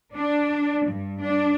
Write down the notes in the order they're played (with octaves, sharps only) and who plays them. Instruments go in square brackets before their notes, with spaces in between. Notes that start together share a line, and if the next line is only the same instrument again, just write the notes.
[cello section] D4
G2
D4